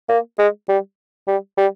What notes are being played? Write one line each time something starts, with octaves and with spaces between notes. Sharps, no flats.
A#3
G#3
G3
G3
G3